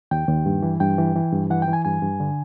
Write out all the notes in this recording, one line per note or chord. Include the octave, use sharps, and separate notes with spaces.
D#2 G5
D#2
G2
E3
G2 G5
E3
E3
G2
E3 F#5
G5
E3
G#5
G2 G#5
G2
D3